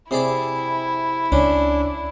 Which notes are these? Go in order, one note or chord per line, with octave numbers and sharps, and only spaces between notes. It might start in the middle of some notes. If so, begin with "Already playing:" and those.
C3 E4 G#4 D5
C#2 C#4 D4